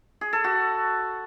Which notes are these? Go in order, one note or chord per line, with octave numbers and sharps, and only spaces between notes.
G#4
A4
F#4